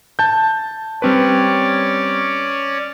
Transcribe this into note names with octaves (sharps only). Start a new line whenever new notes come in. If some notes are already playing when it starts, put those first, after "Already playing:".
A5 G6
G3 C4 C#4 B4 C#5 D5